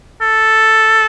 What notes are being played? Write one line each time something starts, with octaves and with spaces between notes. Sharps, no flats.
A4